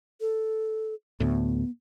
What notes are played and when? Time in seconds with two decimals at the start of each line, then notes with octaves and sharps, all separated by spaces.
0.21 A4
1.20 D2 A2 B3